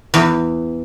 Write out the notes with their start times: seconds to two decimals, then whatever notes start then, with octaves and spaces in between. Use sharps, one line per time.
0.14 E2